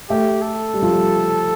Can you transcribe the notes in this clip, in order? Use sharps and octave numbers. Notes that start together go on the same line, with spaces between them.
A3 G4
A4
G3
F3
G3